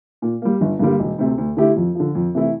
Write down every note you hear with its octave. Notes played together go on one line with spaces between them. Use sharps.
A#2
G3 A#3
G1
G2 D3 G3 A#3
E1
D2 C3
D2
D3 A3 E4 G4
F2
D3 F3
F2
C3 E3 A3 E4